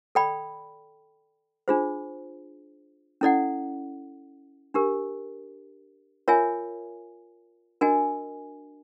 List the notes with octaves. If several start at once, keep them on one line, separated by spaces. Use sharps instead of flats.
A4 D5 G5 B5
D4 F4 G#4 C5
C#4 E4 A4 D5 F#5
D4 G4 A#4
F4 A#4 C#5 E5 G#5
D4 F#4 A#4 D#5 G#5